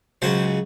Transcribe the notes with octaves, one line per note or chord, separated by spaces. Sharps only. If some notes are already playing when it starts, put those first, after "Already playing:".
C#2 C#3 F#3 C5